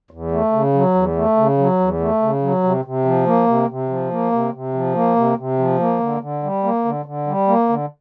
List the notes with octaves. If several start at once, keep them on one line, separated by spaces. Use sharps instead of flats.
E2
A3
C#3
F#3
E2
A3
C#3
F#3
E2
A3
C#3
F#3
C3
C3
F3
A#3
C3
C3
F3
A#3
C3
C3
F3
A#3
C3
C3
F3
A#3
D3
D3
G3
A#3
D3
D3
G3
A#3
D3